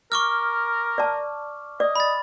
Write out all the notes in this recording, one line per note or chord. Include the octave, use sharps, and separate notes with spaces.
A#4 C#6 D6 F6
D5 A5
D5 D#5
B5 A6